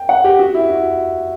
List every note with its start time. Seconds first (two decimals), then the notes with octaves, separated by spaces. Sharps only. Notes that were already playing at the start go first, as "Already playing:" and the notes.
Already playing: G5
0.09 F#5
0.24 G4
0.39 F#4
0.54 E4
0.69 F#4